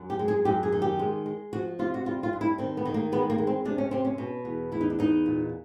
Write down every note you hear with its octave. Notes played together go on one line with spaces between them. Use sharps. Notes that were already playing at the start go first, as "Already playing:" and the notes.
Already playing: F#2
G4
G#3
G#4
F#2 G4
G#4
D#3
G4
G#3
G#3
F3 F#4
C3 F4
F#4
G3 F4
F4
G2
E4
D#3 C4
B3
D#3
A#3
G#3 B3
A#3
G#3
C4
C3 D4
C#4
C3 C4
C#4
B2
E2
E2 E4
D#4
D4
E2 D#4
A#2